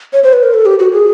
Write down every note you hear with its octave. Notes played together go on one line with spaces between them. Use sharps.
C#5
C5
B4
A#4
A4
G4
F#4
G#4